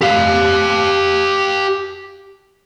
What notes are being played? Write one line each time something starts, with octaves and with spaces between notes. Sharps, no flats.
G4 F5